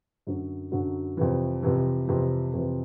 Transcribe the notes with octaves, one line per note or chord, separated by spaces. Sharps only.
F#2 D3 F#3
F#2 D3 F#3
F2 C3 E3
F2 C3 E3
F2 C3 E3
F2 C3 E3